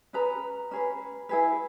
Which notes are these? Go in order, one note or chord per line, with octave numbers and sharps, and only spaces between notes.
C#4 G#4 B4 A#5
C#4 G#4 B4
E4 G#4 B4